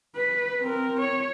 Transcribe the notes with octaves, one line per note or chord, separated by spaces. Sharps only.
B4
C4 A#4
C#5